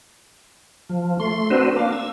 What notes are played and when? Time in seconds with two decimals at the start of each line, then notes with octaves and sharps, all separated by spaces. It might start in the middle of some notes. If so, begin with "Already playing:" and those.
0.89 F3
1.20 A3 C6
1.50 C4 D4 F#4 B4 C5
1.76 A#3 D4 F5
1.92 E6